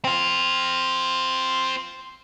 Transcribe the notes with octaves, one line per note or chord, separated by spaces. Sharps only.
C4 F4